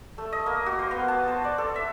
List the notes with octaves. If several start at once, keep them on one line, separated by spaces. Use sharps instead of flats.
A3
D#5
A#3
F#4
C5
B3
A5
C5
D5
A4
E5